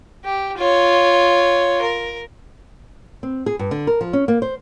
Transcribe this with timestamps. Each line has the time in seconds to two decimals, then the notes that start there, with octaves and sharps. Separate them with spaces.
0.24 G4
0.58 F4 C#5
1.82 A#4
3.23 C4
3.46 G#4
3.59 G2
3.71 D3
3.87 A#4
4.01 F3
4.13 C#4
4.28 A#3
4.42 C5